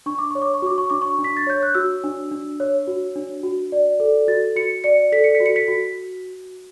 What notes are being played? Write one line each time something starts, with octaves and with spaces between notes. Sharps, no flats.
D4 C#6
D6
C#5 C#6
D6
C#6
F#4 D6
C#6
D4 D6
C#6
D4
B6
A6
C#5 G6
F#6
F#4 E6
D4
D4
C#5
F#4
D4
F#4
D5
A4
F#4 A6
F#4 C#7
D5 C#7
A4 B6
C#7
B6
F#4
C#7
B6
F#4